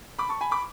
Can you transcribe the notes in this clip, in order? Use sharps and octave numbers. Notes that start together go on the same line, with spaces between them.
B5 D6
A5 C#6
G#5 B5
B5 D6